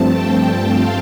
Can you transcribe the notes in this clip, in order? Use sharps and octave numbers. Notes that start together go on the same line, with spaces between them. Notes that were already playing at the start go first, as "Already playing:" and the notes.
Already playing: G2 F3 A3 C4 A5
G5
F5